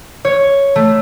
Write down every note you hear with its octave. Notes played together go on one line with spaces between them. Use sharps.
C#5
A3